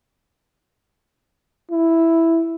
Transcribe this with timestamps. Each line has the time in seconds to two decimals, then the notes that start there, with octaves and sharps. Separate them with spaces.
1.71 E4